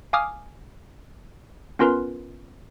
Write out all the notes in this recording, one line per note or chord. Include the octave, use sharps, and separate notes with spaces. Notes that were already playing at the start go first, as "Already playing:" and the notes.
F5 G#5 D6 D#6 F6
B3 C#4 F4 A#4 B4 C6